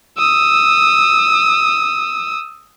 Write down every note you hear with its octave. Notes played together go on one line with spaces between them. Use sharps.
D#6 E6